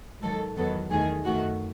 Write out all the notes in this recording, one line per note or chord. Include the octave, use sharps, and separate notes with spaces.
G#2 D#3 F#3 A4
E2 D#3 F#3 B3 A4
E2 D#3 A3 G#4
F#2 D#3 A3 F#4